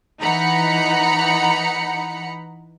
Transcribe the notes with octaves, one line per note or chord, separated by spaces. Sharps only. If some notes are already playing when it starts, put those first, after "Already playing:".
E3 D#4 F#5 A#5 B5 C#7